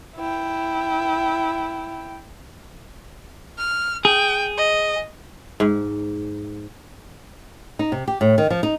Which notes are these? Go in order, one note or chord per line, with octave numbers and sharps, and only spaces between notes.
E4 G5
F6
G#4 G5
D#5
G#2
D#4
C3
G4
A2
D#3
F3
D#4